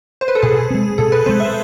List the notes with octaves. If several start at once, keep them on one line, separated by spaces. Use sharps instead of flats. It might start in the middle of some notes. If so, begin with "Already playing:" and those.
C5
B4
A4
B2 G#4
G#3 C4
B2 A4
B4
G#3 C4 C5
E5